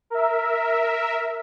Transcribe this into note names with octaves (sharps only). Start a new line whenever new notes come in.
A#4 E5